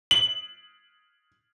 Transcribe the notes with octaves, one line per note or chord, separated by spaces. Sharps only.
F#7